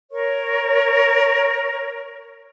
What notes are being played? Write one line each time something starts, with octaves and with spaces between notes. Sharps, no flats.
A#4 C#5 C#6